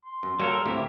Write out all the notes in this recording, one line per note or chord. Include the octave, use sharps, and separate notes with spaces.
C6
F#2
F#3 G3 A#3 A4 A#4
D2 A2 C3 A#3 E4 G4